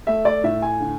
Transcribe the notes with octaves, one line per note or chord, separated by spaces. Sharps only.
A3 E5
D5
A2 E5
G#5
D3